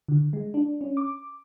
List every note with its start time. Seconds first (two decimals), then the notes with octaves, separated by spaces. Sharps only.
0.08 D3
0.33 G#3
0.54 D4
0.81 C#4
0.97 D6